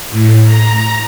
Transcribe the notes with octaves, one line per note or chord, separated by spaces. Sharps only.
A2
A#5